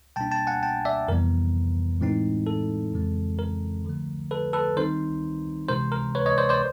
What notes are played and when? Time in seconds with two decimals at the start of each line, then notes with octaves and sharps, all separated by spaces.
0.16 B2 G3 A#3 D4 G5 A5
0.31 G5 A5
0.47 F#5 G#5
0.63 G5 A5
0.85 D5 E5
1.08 F2 C3 E3 G3 B3 A#4
2.01 A2 E3 G#3 C4 D#4
2.47 A4
2.93 F2 C#3 E3 G#3 C4
3.39 A#4
3.85 D3 F3 A3
4.31 A4 B4
4.53 A4 B4
4.77 D#3 G3 C4 D#4 A#4 C5
5.68 C3 E3 G#3 C4 A#4 C5
5.92 A#4
6.15 B4 C#5
6.26 C#5 D#5
6.38 C5 D5
6.49 C5 D5